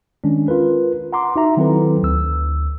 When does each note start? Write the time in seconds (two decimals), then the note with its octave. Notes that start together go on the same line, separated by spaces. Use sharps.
0.24 D#3 G#3 C#4 D4
0.48 F4 A#4 B4
1.13 F#5 A#5 C6 D6
1.36 D#4 F#4 E5 A#5
1.57 D#3 F#3 C4 E4 A4 B4
2.03 D2 E6